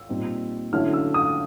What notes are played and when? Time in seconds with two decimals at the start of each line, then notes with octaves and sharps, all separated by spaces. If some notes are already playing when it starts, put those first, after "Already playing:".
Already playing: E6
0.09 A#2 G3 C4 D#4
0.73 D3 F#3 A3 C#4 E4 F6
0.93 E6
1.14 D#6